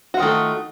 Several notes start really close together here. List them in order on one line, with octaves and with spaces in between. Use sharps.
F#4 F4 D#3 A3